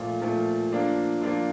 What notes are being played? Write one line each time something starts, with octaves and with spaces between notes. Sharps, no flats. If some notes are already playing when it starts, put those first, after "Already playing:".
Already playing: A#2 F3 A3
A#2 F3 A3
F3 A#3 D4 F4
F3 A#3 D4 F4